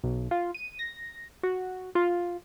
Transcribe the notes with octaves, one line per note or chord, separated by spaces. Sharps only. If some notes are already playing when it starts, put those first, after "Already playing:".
B1
F4
D#7
A#6
F#4
F4